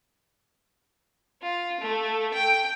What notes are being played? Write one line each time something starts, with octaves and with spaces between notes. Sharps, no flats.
F4
A3
G5